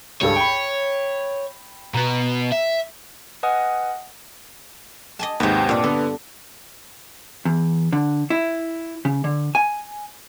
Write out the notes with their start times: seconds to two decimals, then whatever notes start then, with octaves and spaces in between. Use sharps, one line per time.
0.21 C#2 G2 A4 C#5
0.36 G5 B5
1.94 B2 B3 A#5
2.52 E5
3.43 B4 D#5 F#5 G#5 D#6 F6
5.19 D#5 G#5 A5
5.40 D#2 G#2 C3 B3
5.69 G2 A#2 D4
5.84 D3 B3 A4
7.45 E2
7.92 D3
8.30 E4
9.05 C#3
9.24 D3
9.55 G#5